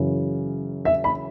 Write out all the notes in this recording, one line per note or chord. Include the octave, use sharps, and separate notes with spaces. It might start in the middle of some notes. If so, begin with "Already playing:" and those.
Already playing: F#2 C#3 E3
E5
B5